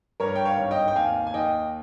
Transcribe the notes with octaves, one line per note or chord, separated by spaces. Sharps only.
G2 A#4 C#5
G5
C#5 F5
G#1
D#5 G5
G5
D#2 F5 G#5
G#5
D#2 D#5 G5